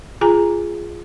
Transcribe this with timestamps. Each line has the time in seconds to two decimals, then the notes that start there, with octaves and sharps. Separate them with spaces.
0.21 F4 G#4 G#5 A#5